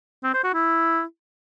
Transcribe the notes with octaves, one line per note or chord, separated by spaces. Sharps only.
C4
C5
F#4
E4